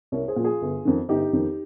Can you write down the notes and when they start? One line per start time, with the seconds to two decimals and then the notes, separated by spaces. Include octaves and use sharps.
0.12 C2 A#4 C#5
0.28 G#4 C5
0.36 A#2 F3
0.44 F4 G#4
0.61 G1
0.85 F2 D#3
1.09 G1 D#4 G4
1.33 F2 D#3